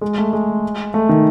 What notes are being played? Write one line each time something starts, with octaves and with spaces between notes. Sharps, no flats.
G#3
A3
G#3
A3
D#3